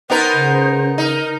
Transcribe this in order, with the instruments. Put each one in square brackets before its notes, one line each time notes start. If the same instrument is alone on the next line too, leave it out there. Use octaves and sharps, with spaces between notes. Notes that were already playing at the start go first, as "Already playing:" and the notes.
[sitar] B3 D#4 A#4 [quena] C5
[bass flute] C#3
[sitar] D#4 [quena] A#4